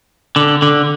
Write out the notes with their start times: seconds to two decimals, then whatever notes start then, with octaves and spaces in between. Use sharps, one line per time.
0.36 D3
0.62 D3